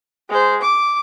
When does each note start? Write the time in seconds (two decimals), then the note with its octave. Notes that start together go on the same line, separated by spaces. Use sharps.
0.29 G#3 C5
0.61 D6